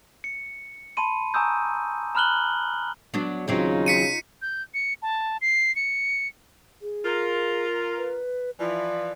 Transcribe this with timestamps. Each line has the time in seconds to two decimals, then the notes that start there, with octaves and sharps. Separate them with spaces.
0.24 C#7
0.97 A5 B5 C6 D#7
1.34 G#5 A#5 C#6 D#6 E6 G6
2.15 A#5 B5 F6 F#6 F#7 G7
3.14 F#3 B3 D4
3.48 D#2 C#3 F#3 C4 D#4 F4
3.86 B6 C#7 D#7
4.42 G6
4.74 C#7
5.02 A5
5.42 C7
5.76 C#7
6.82 G#4
7.04 F4 A#4
7.97 B4
8.59 E3 F3 D5